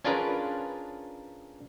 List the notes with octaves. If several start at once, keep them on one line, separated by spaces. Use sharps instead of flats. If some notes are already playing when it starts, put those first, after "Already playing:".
C#4 D4 F4 G#4 A#4 B4